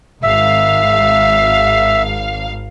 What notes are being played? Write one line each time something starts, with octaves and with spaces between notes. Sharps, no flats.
G#1 E5 F5